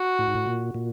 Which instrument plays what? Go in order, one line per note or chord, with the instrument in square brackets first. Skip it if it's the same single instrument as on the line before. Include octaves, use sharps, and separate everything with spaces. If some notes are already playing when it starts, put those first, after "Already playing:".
Already playing: [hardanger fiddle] F#4
[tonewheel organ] A2
G#2
A2
A#2
A#2